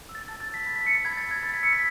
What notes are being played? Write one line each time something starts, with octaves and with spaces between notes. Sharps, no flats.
E6
A6
A5 A6
A6
E6
B6
B5 A6
B6
E6 C#7
A6
B5 G#6
A6
E6
G#6
B5 A6
B6
E6 C#7
B6